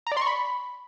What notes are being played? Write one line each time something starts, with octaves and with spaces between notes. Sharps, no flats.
A#5
D5
C6
C#6
B5